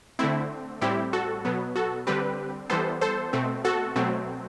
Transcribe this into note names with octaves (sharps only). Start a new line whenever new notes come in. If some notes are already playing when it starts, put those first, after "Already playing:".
D3 A3 C4 E4
A2 G3 C4 E4 G4
F#4 A4
B2 F#3 B3
F#4 A4
D3 G3 C4 G4 B4
E3 G3 B3 A4 C5
A4 C5
B2 A3 C4
F#4 A4
B2 F#3 A3 C4